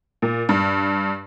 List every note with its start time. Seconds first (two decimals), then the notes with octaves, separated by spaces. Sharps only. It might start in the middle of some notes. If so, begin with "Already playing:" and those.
0.22 A#2
0.49 G2